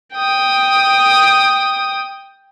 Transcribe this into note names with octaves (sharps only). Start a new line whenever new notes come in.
G5 D#6